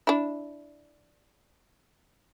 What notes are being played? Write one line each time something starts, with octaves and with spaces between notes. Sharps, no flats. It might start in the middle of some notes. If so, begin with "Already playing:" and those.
D4 E4